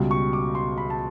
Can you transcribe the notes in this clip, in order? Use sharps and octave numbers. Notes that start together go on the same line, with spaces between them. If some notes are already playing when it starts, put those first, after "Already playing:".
Already playing: C#2 B2 G3
C#6
D6
C6
B5
A5